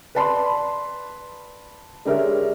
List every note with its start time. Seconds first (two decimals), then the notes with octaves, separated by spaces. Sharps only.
0.15 B4 D5 A5 B5 C6
2.05 G#3 D4 G4 A#4 C#5 E5